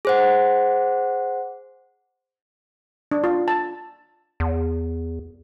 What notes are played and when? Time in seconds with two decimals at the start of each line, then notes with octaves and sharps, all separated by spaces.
0.05 G#4 C5 F#5
3.11 D4
3.24 F4
3.48 A5
4.40 E2